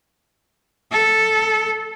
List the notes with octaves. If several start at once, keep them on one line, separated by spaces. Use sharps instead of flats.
A4